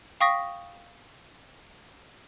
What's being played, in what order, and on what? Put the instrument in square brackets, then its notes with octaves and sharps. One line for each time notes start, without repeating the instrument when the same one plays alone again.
[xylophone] F5 G5 C#6 D#6 A#6 B6